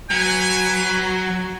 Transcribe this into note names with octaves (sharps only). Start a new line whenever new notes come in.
F#3 B4 G#5